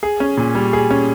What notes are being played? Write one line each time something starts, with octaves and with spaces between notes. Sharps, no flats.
G#4
C#4
A#2
G3
G#4
C#4